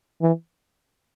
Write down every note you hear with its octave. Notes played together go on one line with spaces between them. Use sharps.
E3